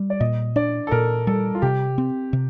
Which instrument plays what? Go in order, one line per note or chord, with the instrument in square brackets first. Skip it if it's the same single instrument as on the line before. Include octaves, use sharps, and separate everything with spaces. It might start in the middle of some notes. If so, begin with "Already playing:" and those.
Already playing: [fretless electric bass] G3
[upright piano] D5
[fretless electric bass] A#2 [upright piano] D#5
[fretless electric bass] D4 [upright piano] D5
[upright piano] A4
[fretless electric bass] A#2 [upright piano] A#4
[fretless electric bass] G3 [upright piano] A4
[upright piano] F4
[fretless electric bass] C3 [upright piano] G4
[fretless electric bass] C4
C3